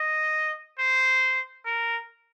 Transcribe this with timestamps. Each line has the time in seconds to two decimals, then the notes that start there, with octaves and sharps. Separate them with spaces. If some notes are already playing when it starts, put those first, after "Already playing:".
Already playing: D#5
0.79 C5
1.66 A#4